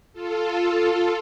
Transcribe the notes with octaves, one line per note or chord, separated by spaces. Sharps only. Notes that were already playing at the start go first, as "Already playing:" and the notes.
F4 A4